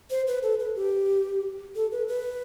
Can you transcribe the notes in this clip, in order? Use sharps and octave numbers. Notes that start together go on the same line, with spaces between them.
C5
B4
A4
B4
G4
A4
B4
B4